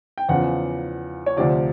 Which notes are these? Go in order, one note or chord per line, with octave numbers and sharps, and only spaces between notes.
G5
E2 C#3 F3 F#5
C#5
D2 C3 F3 D5